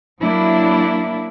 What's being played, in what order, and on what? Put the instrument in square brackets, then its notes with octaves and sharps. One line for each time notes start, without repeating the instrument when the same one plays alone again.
[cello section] F#3 A#3 D4 E4